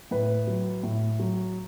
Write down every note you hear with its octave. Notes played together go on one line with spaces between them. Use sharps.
A2 B4
F#3
A2
F#3